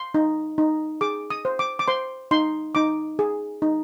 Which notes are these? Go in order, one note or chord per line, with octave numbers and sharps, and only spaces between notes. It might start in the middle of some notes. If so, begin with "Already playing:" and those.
Already playing: C6
D#4
D#4
G#4 D6
D#6
C5
D6
D6
C5 C6
D#4 C6
D#4 D6
G#4
D#4